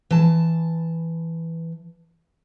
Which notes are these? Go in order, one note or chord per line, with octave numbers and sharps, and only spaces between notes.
E3 A5